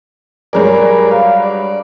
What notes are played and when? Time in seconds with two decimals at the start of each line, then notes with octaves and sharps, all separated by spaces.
0.53 G2 F#3 G#3 G#4 A#4 D5
1.11 F5
1.42 D5